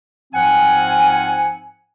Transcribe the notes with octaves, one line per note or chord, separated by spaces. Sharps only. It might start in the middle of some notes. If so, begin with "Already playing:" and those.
G#2 F3 C4 F#5 G#5